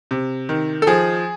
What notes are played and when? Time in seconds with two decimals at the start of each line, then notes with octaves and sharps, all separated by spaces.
0.11 C3
0.49 D#3
0.82 A4
0.87 F3 G#4